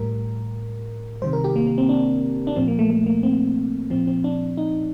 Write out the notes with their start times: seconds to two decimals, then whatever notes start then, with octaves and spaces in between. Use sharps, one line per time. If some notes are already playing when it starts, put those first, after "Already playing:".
Already playing: A2 G3 A#4
1.22 C3 D#3 G3 C5
1.33 A#4
1.44 G4
1.56 A#3
1.67 A#3
1.78 C4
1.89 D4
2.47 D4
2.56 A#2 F3 C4
2.68 A#3
2.79 A3
2.90 A3
3.06 A#3
3.23 C4
3.90 A#2 F3 C4
4.07 C4
4.24 D4
4.57 D#4